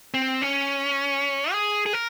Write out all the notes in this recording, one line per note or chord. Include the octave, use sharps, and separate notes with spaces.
C4
C#4
G#4
G#4
A#4